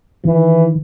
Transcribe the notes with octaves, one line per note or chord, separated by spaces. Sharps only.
D#3 E3